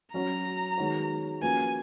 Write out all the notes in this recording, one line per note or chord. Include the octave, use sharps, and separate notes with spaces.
F#3 C#4 F#4 C#5 A#5
D#3 G#3 B3 F#4 C#5
F3 A#3 C#4 F#4 B4 G#5